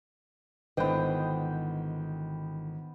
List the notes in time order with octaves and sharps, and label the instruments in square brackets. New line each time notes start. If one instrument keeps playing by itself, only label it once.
[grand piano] G#1 [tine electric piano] D3 E3 [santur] B3 G5 [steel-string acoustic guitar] B4 C5 D#5